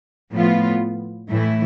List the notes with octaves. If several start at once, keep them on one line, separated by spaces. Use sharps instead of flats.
A2 F3 B3 F4
A2 E3 A3 E4